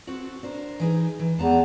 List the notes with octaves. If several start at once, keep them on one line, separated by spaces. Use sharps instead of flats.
C4 F#4 A4
D4 A#4 C5
E3 D#4 G#4
E3
E2 G#3 A5 A#5